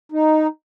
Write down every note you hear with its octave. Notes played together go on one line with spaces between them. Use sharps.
D#4